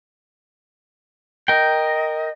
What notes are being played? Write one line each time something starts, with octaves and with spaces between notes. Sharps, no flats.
A#4 D#5 G5